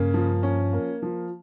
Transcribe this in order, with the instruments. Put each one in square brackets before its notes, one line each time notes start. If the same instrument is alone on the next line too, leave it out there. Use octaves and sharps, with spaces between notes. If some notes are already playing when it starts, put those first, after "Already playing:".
Already playing: [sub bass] G2 [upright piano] C#3 A#3
[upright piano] F3
C#4
A#3
F3